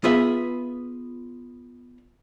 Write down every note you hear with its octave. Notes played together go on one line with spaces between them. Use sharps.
B3 F4 G#4 B4 E5